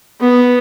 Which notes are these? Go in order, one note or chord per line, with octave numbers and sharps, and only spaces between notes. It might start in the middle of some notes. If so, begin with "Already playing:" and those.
B3